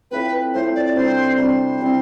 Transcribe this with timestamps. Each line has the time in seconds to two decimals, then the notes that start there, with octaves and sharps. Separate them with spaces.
0.11 A2 F3 A3 C4 B4
0.54 A2 F3 A3 C4 C5
0.75 D5
0.85 D5
0.95 C3 G3 D4 C5
1.37 C3 G3 D4 C5
1.79 C3 E3 G3 C4